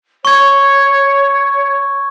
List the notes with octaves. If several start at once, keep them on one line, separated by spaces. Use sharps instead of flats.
C#5 C#6 G#6